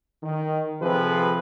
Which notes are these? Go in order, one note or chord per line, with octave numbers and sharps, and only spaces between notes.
D#3
C3 F3 C4 G#4 A4 B4